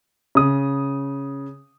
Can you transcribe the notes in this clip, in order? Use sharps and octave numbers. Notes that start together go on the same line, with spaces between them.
C#3 D#6